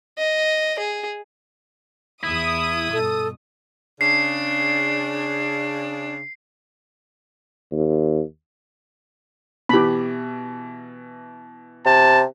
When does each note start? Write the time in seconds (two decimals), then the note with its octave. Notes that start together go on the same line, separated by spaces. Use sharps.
0.18 D#5
0.79 G#4
2.23 E2 E4 D#6
2.93 G2 B2 A4
4.01 C#3 D4 C7
7.72 D#2
9.69 B2 E3 G4 B5
11.86 C3 A5